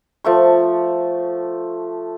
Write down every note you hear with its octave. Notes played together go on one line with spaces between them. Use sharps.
F3 A3 C#6